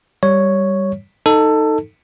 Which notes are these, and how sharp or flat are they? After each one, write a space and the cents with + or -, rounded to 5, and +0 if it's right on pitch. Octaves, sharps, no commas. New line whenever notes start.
G3 +0 C#5 +0
D#4 +0 A4 +15